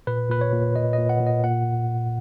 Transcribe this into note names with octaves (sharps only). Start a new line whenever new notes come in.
A#2 B4
A#2 B4
C#5
A#2
A#2 D#5
D#5
A#2
F#5
A#2
D#5
A#2 F#5